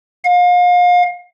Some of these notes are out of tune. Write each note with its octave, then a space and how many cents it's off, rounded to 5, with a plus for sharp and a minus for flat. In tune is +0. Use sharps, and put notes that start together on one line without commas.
F5 +35